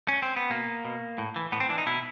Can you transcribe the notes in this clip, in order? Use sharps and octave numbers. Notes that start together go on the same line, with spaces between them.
C#4
C4
B3
B2 A#3
B2
A2
E3
A2 B3
C4
E3 D4
D#4
B2 E4